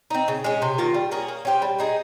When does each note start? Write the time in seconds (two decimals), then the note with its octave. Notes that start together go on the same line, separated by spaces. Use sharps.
0.10 C4 D#4
0.28 C#3
0.44 G#3 C#4
0.62 C3
0.78 D#3 A#3 F4
0.94 G3
1.11 A#3 C#4 G#4
1.28 A#3
1.45 C#4 G4 C5
1.62 G3
1.79 C4 D#4 G#4